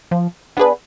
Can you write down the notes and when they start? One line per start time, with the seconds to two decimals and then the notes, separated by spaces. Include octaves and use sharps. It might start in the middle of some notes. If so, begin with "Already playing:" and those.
0.11 F3
0.57 B3 D4 G#4 B4